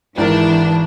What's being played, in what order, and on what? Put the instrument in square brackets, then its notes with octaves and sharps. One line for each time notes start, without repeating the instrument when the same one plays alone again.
[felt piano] G#1 G#2 A#4 [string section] E3 D4 [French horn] E4